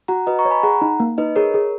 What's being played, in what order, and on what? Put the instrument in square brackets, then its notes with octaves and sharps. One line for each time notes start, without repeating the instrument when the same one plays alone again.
[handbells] F#4 [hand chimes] F#5 A#5
[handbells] F#4 [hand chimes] B4 D#5
[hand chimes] A#5 C#6
[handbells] C#5
[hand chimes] G#5 B5
[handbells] G#4 [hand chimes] F#5 A#5
[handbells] D#4
A#3
[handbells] D#4 [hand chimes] B4 D#5
[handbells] G#4 [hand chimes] A#4 C#5
[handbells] G#4